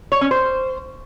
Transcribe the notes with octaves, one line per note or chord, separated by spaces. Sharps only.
C#5
C#4
C5